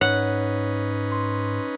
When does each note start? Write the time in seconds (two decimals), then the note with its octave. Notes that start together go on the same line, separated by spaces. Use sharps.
0.01 G#2 C#4 D#4 B4 C#5 F#5
1.12 C6